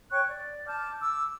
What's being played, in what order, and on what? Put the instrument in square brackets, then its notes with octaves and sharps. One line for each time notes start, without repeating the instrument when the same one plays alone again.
[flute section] C#5 G5 C#6 F#6
D5
A5 D6 F6 G6
D6 E6